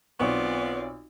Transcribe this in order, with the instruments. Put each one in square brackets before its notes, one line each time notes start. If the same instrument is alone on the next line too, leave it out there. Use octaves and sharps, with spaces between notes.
[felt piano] B1 C4 C#6 [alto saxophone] B3 [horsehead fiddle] F4 D5